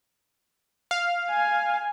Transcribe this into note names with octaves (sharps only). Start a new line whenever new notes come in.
F5
G#5